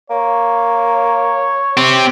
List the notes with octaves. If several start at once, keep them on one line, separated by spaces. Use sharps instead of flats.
A#3 C#5
C4 G4